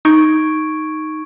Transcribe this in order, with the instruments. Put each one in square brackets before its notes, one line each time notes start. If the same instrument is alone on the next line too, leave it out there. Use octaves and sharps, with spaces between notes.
[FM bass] D#4 [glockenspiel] C#6 G#6 D7